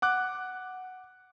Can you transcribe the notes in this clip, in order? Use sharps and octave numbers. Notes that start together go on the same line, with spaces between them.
F#5 D6 F#6